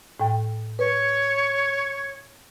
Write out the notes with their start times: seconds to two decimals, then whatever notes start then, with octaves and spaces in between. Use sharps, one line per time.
0.20 A2 G5
0.79 B4 C#5